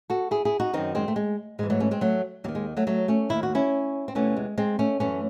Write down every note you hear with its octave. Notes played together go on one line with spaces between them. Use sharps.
F#4 A4
E4 G#4
E4 G#4
D#4 F#4
F#2 D#3 C4 D#4
G#3 C4
A3
G#3
G#2 E3 G#3
F#3 A3
A3 C#4
G#3 C4
F#3 A3
D#2 D#3 F#3
G#3
F#3 A3
F#3 A3
A3 C#4
D#2 D#3 E4
F#4
C#4 E4
C4
E2 C3 E3 A3 C#4
G#3
G#3 C4
A3 C#4
F#2 E3 A3 C#4